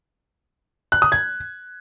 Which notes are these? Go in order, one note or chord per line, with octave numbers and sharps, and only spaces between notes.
F#6
D#6
G#6